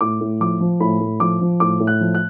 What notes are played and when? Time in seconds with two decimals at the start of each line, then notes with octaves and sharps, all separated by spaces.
0.01 A2 D6
0.21 A2
0.40 F3 D6
0.60 F3
0.80 A2 B5
1.00 A2
1.20 F3 D6
1.41 F3
1.60 A2 D6
1.80 A2
1.87 F#6
2.01 F3
2.15 F#6